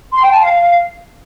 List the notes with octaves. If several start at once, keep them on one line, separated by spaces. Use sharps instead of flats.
C6
G5
A5
F5